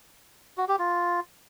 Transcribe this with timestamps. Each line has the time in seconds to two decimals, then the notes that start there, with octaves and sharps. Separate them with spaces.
0.58 F#4
0.68 G4
0.79 F4